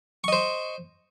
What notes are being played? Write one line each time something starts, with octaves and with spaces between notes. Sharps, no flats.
C5 D#5 C#6